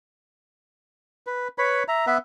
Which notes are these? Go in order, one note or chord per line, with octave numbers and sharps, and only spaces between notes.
B4
B4 C#5 B5
E5 A#5
B3 B4 E5